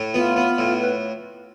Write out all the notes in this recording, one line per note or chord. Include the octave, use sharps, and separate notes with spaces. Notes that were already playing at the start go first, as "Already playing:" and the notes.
Already playing: A2
B3 F4
B3
A2
B4